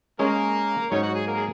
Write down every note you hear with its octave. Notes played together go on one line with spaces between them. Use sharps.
G#3 A#3 C#4 G#4 A#4 C#5
G#2 F#3 C#4 D#4 C#5
F#4 F#5
G#4 G#5
A#3 A#4
G#4